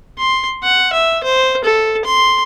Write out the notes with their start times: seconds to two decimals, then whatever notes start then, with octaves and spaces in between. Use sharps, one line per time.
0.18 C6
0.63 F#5
0.93 E5
1.24 C5
1.64 A4
2.05 C6